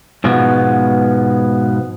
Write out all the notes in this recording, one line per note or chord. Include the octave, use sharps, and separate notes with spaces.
G#2 B2 F3 G#3 B3